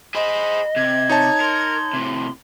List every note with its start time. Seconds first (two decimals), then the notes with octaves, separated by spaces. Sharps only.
0.15 G#4 C5 D#5 B5
0.76 C3 G#6
1.09 D#4 C#5 A5
1.41 A#4 C6
1.93 A2 C3